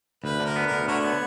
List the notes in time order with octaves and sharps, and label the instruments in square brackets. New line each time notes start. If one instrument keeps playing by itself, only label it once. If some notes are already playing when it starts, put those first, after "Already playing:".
[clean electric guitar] D2 [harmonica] B4
[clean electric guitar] D3
[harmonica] A#4
[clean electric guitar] B3
[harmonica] A#4
[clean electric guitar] D2
[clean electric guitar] D3 [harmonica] F#4 A#4 C#5
[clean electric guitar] B3